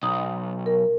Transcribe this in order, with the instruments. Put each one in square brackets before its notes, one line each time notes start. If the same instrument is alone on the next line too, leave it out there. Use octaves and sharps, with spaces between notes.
[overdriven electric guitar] B1 [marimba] D#6
[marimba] A#4